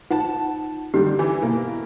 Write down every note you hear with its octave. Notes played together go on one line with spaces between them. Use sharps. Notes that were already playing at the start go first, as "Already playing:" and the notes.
D#4 F4 C5 F#5 A5
D3 D#3 G3 G4
E3 E4
B2 A#3 E4